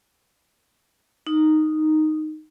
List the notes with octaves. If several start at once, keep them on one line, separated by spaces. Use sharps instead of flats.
D#4